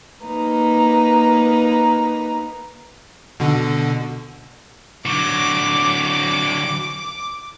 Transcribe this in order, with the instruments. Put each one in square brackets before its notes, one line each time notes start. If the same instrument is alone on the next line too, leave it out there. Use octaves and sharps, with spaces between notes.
[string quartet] A#3 D#4 B4 A#5
[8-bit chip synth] B2 D3
[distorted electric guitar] D3 F#3 [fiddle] D6